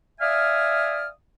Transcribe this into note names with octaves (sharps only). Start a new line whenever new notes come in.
D5 E5 F5 G#5 D#6 F6